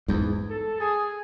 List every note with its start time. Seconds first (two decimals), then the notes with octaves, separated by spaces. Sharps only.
0.08 E2 G#2
0.50 A4
0.80 G#4